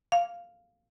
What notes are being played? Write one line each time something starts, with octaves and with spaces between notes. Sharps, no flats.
F5